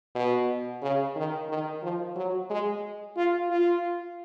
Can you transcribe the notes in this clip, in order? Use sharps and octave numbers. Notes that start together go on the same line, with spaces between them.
B2
C#3
D#3
D#3
F3
F#3
G#3
F4
F4